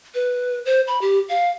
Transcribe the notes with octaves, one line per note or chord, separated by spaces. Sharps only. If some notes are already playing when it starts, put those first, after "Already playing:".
B4
C5
B5
G4
F5